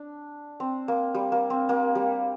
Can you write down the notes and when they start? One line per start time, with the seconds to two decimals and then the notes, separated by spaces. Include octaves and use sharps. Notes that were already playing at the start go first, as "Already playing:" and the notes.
Already playing: D4
0.60 C4
0.88 A#3
1.14 G3
1.32 A#3
1.50 C4
1.69 A#3
1.95 G3